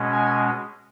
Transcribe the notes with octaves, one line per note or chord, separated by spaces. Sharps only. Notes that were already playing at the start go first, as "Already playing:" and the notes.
Already playing: B2 G#3 C#4
G#5